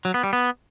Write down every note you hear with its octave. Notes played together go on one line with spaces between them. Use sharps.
F#3
B3
G3
B3